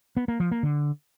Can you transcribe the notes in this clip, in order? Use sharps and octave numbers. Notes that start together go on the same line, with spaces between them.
B3
A#3
F3
A#3
D3